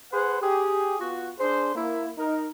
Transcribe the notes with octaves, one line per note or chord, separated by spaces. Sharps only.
G#4 B4 C5 F#5
G4 G#4
B3 F4 F#4
D4 G#4 C5
A#3 E4
D#4 A#4